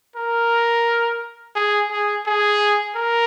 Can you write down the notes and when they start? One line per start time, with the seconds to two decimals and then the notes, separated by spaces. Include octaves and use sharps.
0.16 A#4
1.55 G#4
1.91 G#4
2.26 G#4
2.96 A#4